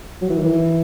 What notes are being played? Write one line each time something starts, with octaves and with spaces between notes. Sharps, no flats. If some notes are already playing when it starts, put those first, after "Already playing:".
F#3
E3
D#3
E3